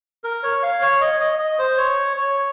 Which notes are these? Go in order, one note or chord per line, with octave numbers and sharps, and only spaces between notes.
A#4
C#5
F5
C#5
D#5
D#5
D#5
C5
C#5
C#5